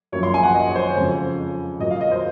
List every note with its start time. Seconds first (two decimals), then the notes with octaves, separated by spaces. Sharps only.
0.12 F#2 F3 A#3 C#5
0.23 C6
0.34 G#5
0.43 F#5
0.54 D#5
0.69 C#5
0.75 C5
0.86 C#5
0.96 F2 C#3 G#3
1.79 A#2 F#3 A#3 D#5
1.90 F5
2.01 D#5
2.11 C5